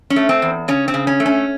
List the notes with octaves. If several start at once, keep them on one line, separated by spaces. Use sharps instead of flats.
C#4
A3
C4
E2
C#3 C#4
C4
C#3
C#4
A3
C#4